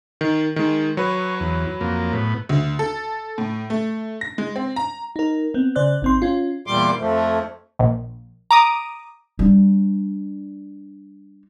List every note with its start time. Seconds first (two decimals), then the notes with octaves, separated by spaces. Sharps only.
0.21 D#3
0.56 D#3 G#3
0.97 F#3 B4 C#5
1.40 E2
1.81 F2 A#3
2.13 A2 B3
2.49 D2
2.79 A4
3.38 A2
3.70 A3
4.21 A#6
4.38 G#3
4.56 C4
4.76 A#5
5.16 D#4 A#4
5.54 B3 C4
5.76 C#3 C5 D5 F#6
6.02 G#1 C4 C6
6.22 C#4 F4
6.67 E2 A#2 G3 C6 D6
6.99 F2 F3 A3
7.79 A#1
8.51 A#5 D6 D#6
9.39 G3 D4